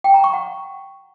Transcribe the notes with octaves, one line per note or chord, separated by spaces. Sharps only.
G5
A#5
C#6
F#5